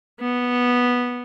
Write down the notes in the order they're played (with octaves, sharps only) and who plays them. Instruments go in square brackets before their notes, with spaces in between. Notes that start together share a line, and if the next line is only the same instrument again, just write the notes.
[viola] B3